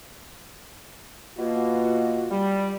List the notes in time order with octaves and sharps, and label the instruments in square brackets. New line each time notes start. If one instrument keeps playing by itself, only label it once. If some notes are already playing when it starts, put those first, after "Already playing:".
[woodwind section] B2 A#3 [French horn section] F4 F#4
[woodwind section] G3